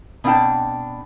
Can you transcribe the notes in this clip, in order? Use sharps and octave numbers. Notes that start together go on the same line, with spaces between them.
B2 C4 D4 F#5 G5 A5